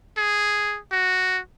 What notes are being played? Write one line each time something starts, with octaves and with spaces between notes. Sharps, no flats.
G#4
F#4